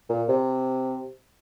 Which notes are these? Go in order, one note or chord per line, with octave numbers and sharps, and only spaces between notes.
A#2
C3